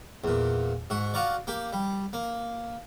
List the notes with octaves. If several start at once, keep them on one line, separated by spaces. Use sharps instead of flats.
E2 A#2
G#2 F#4
F4 F#4 A#4 D5
A#3 G4
G3
A#3